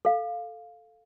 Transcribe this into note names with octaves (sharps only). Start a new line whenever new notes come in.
A4 F5